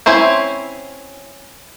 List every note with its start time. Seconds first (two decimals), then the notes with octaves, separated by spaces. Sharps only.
0.06 C4 C#4 E4 C5